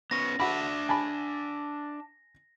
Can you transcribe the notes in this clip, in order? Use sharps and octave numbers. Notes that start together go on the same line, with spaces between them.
B3 C#4 A#6
D4 F#4 E5 B5
G#5 A5 B5